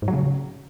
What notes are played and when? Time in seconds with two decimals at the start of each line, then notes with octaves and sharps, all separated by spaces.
0.02 G#2
0.08 F#3
0.13 C#3